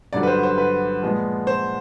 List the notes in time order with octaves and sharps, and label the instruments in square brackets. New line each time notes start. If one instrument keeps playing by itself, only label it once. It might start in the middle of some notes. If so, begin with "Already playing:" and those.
[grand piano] G2 D3 F#3 D5
B4
C5
C5
B4
A#2 F3 G#3 B3
C5